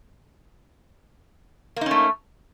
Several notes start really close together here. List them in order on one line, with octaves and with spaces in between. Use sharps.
A#3 D#4 C#4 A3